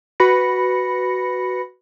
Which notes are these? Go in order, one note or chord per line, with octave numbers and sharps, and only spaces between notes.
F#4 B4 B5 A#6 C#7